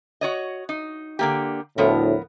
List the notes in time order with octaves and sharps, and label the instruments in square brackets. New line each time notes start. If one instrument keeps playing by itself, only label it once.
[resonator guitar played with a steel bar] F#4 C#5 D#5
D#4
D3 A#3 G4
[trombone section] D2 A2 [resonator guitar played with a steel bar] F3 B3 A#4